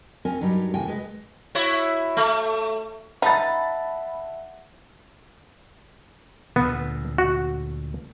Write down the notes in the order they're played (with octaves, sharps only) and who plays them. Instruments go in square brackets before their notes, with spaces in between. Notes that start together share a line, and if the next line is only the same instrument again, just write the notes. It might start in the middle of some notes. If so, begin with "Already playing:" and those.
[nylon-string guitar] C4 C#4 A#4 G#5
G2 F#3 G3 D#4 G4
D#2 A2 C3 G5 G#5
G#3 B4 D#5
[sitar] E4 F#4 C#5
A3
[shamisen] D#4 [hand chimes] E5 F#5 [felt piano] A5 B5 A6
[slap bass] D2 A#2 [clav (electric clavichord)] B3
[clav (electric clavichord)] F#4